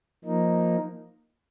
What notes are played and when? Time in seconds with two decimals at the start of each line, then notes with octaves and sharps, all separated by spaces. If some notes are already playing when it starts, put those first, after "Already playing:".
0.25 F3 A#3 D#4